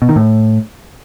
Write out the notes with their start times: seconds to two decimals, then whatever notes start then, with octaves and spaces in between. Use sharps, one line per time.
0.02 B2
0.09 D#3
0.16 A2